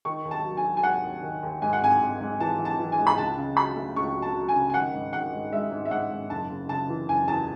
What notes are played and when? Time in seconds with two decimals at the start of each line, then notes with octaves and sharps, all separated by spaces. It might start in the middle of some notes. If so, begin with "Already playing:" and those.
0.05 D#3 C#6
0.25 D#2
0.31 A5
0.45 F#3
0.57 G#5
0.64 F#3
0.77 G#5
0.83 D#2 F#5
1.03 D#2
1.23 D#3
1.43 D#2
1.62 G#2 G#5
1.73 F#5
1.82 G#1 G#5
2.01 G#1
2.21 G#2
2.40 E3 A5
2.59 E3
2.65 A5
2.79 E3
2.92 G#5
2.99 G#2
3.07 B5
3.18 C#2 A5
3.38 C#3
3.57 F#3 B5
3.76 A3
3.96 C#2 C#6
4.15 F#3
4.22 A5
4.35 F#3
4.49 G#5
4.55 C#3
4.70 G#5
4.74 D#3 F#5
4.93 G#2
5.13 D#3 F#5
5.33 G#2
5.53 G#3 E5
5.71 G#2
5.85 E5
5.91 G#2 F#5
6.11 G#2
6.30 F#1 A5
6.50 C#3
6.69 C#3 A5
6.89 E3
7.08 F#1 G#5
7.28 E2 A5